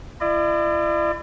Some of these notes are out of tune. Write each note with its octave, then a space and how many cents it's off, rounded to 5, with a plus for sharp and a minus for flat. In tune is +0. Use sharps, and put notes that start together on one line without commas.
E4 +40 D5 +45